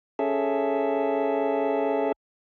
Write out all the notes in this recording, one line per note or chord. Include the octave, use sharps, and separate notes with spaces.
C#4 G#4 A4 E5